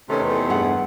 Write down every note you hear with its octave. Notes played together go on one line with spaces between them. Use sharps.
C3 D#3 A3 C#4 A4 B4
E2
G2 G#4 F#5